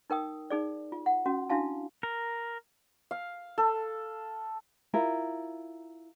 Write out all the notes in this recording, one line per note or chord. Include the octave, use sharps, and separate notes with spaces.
D#4 A#4 G5 D#6
D#4 G#4 D5
F4
F#5
C#4 F#4
D4 E4 F#4 F5 A5
A#4
F5
A4
E4 F4 A#4 A#5